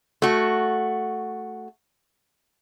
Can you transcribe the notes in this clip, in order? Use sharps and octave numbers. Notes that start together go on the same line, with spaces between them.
A3 F#4